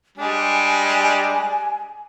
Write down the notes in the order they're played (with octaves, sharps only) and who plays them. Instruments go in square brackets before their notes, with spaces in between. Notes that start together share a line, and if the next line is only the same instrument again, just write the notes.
[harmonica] G3 G#3 D4 [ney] G#5